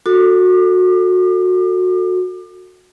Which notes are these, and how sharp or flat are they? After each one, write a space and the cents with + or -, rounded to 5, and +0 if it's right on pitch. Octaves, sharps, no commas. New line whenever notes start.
F#4 -20 A4 +20 D6 +35